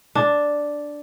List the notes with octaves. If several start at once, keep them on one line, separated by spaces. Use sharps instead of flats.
D4